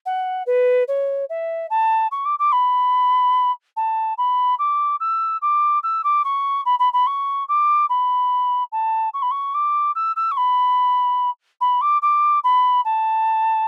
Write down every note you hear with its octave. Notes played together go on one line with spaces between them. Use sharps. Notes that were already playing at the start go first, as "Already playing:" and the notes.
F#5
B4
C#5
E5
A5
C#6
D6
D6
B5
A5
B5
D6
E6
D6
E6
D6
C#6
B5
B5
B5
C#6
D6
B5
A5
C#6
B5
C#6
D6
E6
E6
C#6
B5
B5
D6
D6
B5
A5